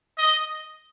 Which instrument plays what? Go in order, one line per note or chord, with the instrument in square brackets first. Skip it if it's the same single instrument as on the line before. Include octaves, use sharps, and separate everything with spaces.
[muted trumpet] D#5